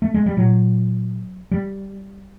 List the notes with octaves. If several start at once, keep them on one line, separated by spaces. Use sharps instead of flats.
A3
G#3
G3
A#2 F#3
G3